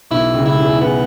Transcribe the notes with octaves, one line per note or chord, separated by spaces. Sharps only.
B1 B2 E4
C#2 C#3
E4
E2 E3
E2 E3 B3